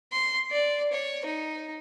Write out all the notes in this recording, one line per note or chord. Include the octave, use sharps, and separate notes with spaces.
C6
D5
C#5
D#4